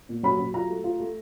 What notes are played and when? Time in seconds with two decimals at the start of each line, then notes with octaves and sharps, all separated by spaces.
0.09 A#2
0.23 F#3 B5
0.39 F#3
0.54 F4 A#5
0.69 A3
0.84 F4
1.00 A3